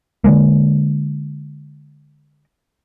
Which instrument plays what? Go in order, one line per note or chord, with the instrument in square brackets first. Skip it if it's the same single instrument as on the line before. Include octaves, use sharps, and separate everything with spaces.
[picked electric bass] D3 F#3 G#3 A#3